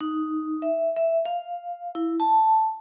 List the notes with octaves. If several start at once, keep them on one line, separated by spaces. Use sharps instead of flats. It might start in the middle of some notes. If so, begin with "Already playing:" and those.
D#4
E5
E5
F5
E4
A5